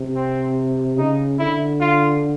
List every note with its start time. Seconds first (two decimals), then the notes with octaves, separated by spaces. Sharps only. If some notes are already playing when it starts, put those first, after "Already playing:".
Already playing: C3
0.15 C4
0.98 C#3 D#4
1.39 D3 E4
1.80 F4